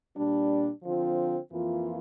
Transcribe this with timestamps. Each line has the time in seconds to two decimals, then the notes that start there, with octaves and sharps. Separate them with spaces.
0.15 A#2 G3 D4
0.83 D3 F3 C4 F4
1.51 F2 E3 A#3 F4